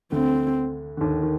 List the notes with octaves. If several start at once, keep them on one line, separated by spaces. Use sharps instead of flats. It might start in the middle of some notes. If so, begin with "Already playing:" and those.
D2 D3 C4
D3
D#2 D#3
D#3